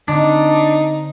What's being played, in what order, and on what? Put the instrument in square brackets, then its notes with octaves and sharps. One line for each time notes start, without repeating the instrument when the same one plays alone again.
[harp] D3 C4 F#5 [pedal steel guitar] D4 [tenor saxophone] D#4